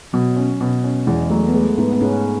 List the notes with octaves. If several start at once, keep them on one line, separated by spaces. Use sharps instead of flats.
B2 F#3
C#4
B2
C#4
E2 G#3
F#3 A3
B3
G#3 A3
G#2 B3
B3
G#2 C#4